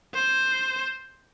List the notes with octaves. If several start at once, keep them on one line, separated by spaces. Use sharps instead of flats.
C5